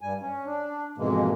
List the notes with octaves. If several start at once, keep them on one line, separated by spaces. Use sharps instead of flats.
G2 G3 G#5
C#4
D4
F2 G#2 B2 E3 G#3 A#3